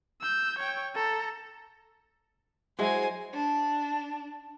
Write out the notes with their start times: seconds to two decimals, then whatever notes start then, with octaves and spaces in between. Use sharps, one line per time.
0.21 E6 G6
0.59 C#5 G5
0.95 A4 A#5
2.79 F#3 G#3 E4 C5 G#5
3.33 D4